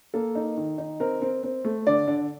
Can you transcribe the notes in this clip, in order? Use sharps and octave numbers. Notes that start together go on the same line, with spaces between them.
A#3 A4
D#4
D#3
D#4
C4 A#4
C4
C4
A3
D3 D5
D3